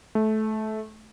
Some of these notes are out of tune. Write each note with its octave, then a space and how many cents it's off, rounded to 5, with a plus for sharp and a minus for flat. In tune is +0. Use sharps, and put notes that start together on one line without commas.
A3 -20